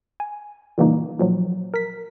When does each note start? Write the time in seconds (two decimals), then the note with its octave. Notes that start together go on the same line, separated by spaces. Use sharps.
0.20 G#5
0.78 A#2 C#3 E3 G3 A#3 D#4
1.19 A#2 F3 F#3
1.74 A#4 B6